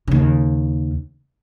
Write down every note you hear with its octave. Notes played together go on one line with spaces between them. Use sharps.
D#2 C#3